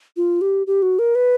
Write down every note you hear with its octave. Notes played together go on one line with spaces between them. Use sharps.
F4
G4
G4
F#4
A#4
B4